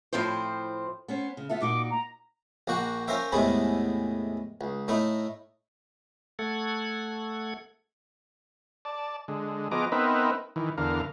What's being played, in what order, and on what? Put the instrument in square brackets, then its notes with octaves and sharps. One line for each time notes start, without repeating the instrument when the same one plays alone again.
[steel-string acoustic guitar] A2 F3 C4 E4 C5
B3 C#4 C5
C#3
[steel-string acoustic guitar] B3 F4 A4 [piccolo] E5
[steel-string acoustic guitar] A#2 D#4 F#4 [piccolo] D6
[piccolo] A#5
[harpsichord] A#1 A#3 F#4 G5
C#4 F4 A#4 C5 E5 G5
E2 A2 C3 G#3 A3 E4
C#2
A2 A3 D#4 E4
[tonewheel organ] A3 A4 F#5 G#6
[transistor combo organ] D5 A5
D3 G#3
F3 B3 G#4 D#5 A#5 D6
B3 C4 D#4 A#4 B4 E5
D#3 E3
E2 D3 A#4 F5